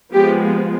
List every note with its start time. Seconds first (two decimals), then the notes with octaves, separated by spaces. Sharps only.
0.13 F3 G#3 B3 G4